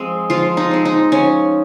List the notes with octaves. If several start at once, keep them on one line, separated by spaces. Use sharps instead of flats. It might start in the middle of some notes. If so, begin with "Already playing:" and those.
Already playing: F3 G#3 C4
F3 F4
D#4
G#3 C4
D#4
F3 C#4